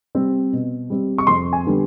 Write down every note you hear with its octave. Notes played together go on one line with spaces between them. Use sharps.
G3 C4
B2
G3 C4
C#6
F2 C6
G#5
D3 G3 B3